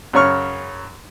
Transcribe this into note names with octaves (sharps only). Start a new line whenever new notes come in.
F#2 C#3 C#5 C#6 F6